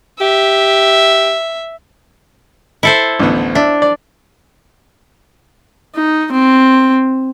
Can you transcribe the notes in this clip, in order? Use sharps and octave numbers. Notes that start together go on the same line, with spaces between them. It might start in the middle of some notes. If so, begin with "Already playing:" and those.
G4 E5
E4 A4 C5
A1 D2 B3
D4 E5
D5
D#4
C4